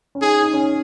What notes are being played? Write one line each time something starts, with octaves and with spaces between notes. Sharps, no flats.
C#4
D#4 G#4
D#4
C#4